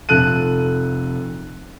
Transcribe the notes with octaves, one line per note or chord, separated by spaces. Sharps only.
F1 F3 A4 F#6 D#7